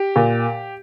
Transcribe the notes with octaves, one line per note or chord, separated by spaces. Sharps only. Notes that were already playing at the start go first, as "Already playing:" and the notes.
Already playing: G4
A#2